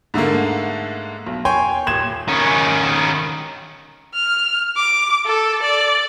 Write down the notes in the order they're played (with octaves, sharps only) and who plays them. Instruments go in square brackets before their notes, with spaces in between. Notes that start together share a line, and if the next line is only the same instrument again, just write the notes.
[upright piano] G#2 D3 A3 A#3
B1
C#5 G5 G#5 C6
D#1 C6 G#6 E7
[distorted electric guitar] D#3 C#4
[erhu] F6
D6
A4
D5